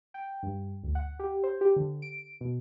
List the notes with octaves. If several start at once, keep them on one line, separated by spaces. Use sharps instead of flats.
G5
G2
D2
F#5
G4
C5
G4
D3
D7
B2